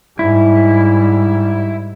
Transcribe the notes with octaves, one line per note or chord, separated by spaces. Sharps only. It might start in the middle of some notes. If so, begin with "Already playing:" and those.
G#2 G3 E4